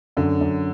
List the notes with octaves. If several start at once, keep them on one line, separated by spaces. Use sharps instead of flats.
F#2 D3
F#2